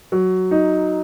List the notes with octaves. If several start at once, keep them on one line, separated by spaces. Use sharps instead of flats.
F#3
D#4